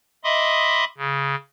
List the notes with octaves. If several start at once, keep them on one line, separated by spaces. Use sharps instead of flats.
D#5 E5 B5 C6 D6 D#6
C#3